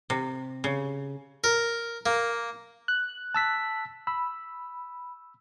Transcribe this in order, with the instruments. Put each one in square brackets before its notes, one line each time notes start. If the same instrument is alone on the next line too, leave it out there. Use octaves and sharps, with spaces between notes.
[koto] C3
C#3
[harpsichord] A#4
A#3
[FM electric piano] F#6
[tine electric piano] A5 E6 B6
[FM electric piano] B5 [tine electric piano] E6